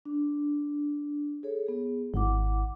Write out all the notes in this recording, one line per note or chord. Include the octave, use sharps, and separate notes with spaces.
D4
G#4 A4 C#5
B3 G#4
G#1 E4 F#5 D6